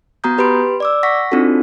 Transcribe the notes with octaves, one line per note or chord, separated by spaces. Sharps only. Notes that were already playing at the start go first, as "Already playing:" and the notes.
B3 F#4 A#5 D#6 G6
G4 B4 B5 C6 D7
D5 D6 E6
F#5 C#6 A#6 B6
C4 D4 D#4 F4 F#4 A4